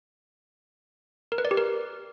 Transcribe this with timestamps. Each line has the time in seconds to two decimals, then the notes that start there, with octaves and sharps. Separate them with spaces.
1.32 A#4
1.38 B4
1.45 D5
1.51 G4
1.57 A#4